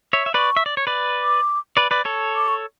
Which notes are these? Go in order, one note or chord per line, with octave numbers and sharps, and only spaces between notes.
C#5 E5
E5
B4 D5 C#6
E5
D5
C#5
B4 D5
D6
B4 D5
B4 D5
A4 C#5
D6
C#6